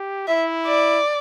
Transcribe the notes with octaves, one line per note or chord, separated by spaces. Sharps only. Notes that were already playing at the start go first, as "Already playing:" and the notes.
Already playing: G4
E4 E5
D5